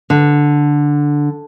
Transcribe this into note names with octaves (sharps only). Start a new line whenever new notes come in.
D3